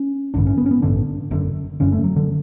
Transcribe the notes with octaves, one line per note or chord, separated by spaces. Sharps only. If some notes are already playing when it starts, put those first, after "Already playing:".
Already playing: C#4
A1 G2 D3 D4
C#4
B3
C#4
B3
A1 G2 D3 D4
F#1 F#2 D3
F#1 F#2 D3 C#4
A3
F#3
D3